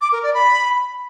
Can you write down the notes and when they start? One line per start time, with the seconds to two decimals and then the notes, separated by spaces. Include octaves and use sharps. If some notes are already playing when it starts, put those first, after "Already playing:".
0.01 D6
0.12 A#4
0.23 D5
0.34 B5